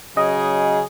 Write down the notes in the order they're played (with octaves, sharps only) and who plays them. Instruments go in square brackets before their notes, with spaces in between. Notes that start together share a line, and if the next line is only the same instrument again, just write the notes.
[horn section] C#3 F#3 G#4 [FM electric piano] D#5